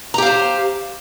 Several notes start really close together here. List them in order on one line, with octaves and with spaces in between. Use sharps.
A#5 G4 F5 C5